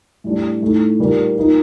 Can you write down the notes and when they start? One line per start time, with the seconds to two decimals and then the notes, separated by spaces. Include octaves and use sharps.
0.24 A2 G3 D4
0.62 A2 A3 D#4
0.99 A#2 G3 A#3 D#4
1.36 F3 A#3 D#4